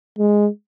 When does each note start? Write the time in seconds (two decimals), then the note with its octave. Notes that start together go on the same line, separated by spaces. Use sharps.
0.18 G#3